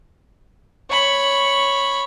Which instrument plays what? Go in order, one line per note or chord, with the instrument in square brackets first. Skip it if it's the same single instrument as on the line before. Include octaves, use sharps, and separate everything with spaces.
[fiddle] C#5 B5